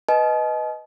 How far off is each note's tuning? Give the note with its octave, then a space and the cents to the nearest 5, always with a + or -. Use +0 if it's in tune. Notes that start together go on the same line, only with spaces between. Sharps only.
B4 +0 D#5 +5 A5 -45